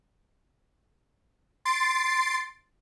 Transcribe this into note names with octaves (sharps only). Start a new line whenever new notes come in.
C6 A6 C7 D7